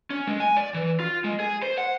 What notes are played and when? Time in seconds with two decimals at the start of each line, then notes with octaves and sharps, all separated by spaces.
0.10 C#4
0.27 G#3
0.40 G#5
0.57 D5
0.74 E3
1.00 F4
1.24 G#3
1.40 G#4
1.62 C5
1.78 F#5